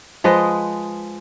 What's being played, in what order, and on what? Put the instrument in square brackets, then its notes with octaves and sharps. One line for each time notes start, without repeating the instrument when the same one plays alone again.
[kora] F3 G#3 B4 D#5